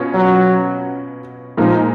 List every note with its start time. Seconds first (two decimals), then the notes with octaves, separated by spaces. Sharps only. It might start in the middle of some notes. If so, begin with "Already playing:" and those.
Already playing: B2 C#4 F4
0.14 F#3
1.57 A#2 F3 G#3 D#4 A#4